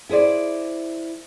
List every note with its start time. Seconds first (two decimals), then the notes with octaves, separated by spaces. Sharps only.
0.09 E4 G#4 C5 D5